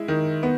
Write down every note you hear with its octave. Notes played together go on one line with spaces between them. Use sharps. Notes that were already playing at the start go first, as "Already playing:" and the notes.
Already playing: G#3 E4
D#3
B3